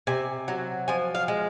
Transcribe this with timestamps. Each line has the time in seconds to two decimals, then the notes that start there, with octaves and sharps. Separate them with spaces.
0.07 C3 G#5
0.48 F#3
0.88 F3 G#5
1.15 F5
1.28 G#3